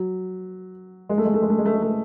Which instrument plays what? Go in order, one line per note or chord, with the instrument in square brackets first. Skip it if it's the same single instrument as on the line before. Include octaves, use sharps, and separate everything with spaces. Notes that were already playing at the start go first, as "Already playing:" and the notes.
Already playing: [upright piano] F#3
G#3
A3
G#3
A3
G#3
A3
G#3
A3
G#3
A3